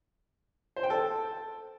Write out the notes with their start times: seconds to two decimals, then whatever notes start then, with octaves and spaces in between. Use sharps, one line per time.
0.76 C5
0.83 G5
0.90 A4